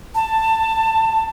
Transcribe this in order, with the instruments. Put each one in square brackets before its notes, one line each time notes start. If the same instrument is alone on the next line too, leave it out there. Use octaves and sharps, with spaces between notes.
[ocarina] A5